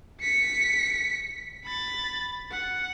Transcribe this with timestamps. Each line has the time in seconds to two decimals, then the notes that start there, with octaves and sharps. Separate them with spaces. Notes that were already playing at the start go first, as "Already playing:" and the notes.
0.21 B6 C#7
1.65 B5 A6
2.52 F#5